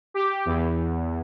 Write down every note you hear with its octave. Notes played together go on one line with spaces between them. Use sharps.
G4
E2